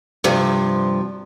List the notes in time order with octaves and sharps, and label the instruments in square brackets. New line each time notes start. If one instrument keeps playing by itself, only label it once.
[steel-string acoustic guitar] G2 C3 F3